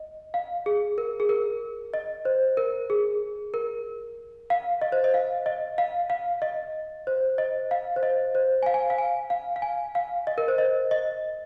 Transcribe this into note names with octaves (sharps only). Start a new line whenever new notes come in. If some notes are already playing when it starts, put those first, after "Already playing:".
Already playing: D#5
F5
G#4
A#4
G#4
A#4
D#5
C5
A#4
G#4
A#4
F5
D#5
C5
D#5
F5
D#5
F5
F5
D#5
C5
D#5
F5
C5
D#5
C5
G#5
F5
G#5
F5
G#5
F5
F5
G#5
F5
D#5
A#4
C5
D#5
D#5